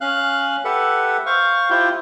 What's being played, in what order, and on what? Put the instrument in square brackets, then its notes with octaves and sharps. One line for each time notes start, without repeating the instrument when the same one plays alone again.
[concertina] C#4 F5 F#6
G4 A4 B4 E5 F#5
C5 F5 C#6
E4 F4 G4 C5 G5